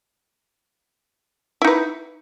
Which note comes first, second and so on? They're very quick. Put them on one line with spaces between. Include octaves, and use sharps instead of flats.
E4 D#4 B4